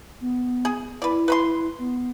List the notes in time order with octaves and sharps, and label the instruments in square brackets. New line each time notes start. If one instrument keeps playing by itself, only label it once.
[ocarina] B3
[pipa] G#4
[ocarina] E4 [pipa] B4 D5
[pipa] B4 B5 C6
[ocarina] B3